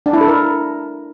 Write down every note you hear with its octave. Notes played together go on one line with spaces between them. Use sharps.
D4
E4
A4
A#4